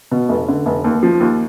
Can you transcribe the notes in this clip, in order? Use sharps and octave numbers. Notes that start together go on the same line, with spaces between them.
B2
F1
D3
F1
D#2
F3
D#2